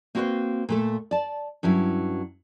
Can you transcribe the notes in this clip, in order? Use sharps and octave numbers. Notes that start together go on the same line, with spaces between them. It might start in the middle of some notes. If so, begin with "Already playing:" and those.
A#3 C4 F#4 A4 B4 C5
A#2 A3 A4
D5 A5
G2 F#3 C#4 E4